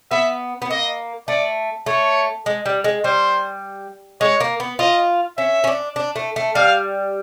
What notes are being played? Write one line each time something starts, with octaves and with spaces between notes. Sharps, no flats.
B3 E5
B3
A#3 D#5
A3 D5
A3 C#5
G#3
G3
G#3
G3 C5
G#3 C#5
A#3
B3
F4 D#5
C#4 E5
C#4
D4
D4
A3
A3
G3 F5